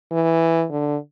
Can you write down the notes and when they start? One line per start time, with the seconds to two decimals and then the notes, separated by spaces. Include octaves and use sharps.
0.11 E3
0.71 D3